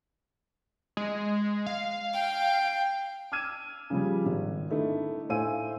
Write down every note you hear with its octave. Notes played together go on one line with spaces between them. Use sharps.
G#3
F5
G5
D6 E6 F6 G#6 D#7 E7
C#3 F3 G3
G#1
D3 A3 D#4 E4
A2 C5 F5 G#5 E6 D#7